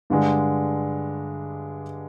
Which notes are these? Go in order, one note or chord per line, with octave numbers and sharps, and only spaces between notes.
G2 D3 G#3 D4